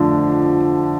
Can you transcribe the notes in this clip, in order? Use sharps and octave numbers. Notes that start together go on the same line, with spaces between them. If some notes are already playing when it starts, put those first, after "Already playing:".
Already playing: F2 D3 F3 A3 D4